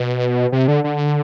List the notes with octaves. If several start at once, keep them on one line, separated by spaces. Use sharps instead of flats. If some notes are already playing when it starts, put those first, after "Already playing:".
Already playing: B2
C3
D3
D3